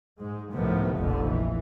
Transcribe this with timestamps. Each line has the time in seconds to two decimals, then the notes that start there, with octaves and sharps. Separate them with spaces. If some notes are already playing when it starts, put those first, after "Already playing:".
0.19 G#2 G#3
0.53 C#2 A2 C3 D#3 F3 B3
0.98 F1 A#1 F2 D3
1.30 E3